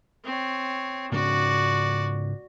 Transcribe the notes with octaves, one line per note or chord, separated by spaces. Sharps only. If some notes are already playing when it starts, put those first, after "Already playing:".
C4 C#5
G#2 C#3 C#4 F#4 D5